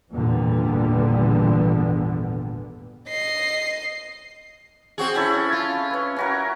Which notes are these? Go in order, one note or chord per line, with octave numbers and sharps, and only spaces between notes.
G#1 E2 A#2 D3 G3 B3
D#5 C7
C4 F#4 G#4
C#4 E4 A4
F4
B4 C#5
C#4 F#4 A#4